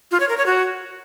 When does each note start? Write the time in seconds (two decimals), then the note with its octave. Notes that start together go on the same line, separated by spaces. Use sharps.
0.11 F4
0.20 C#5
0.29 A#4
0.37 C#5
0.46 F#4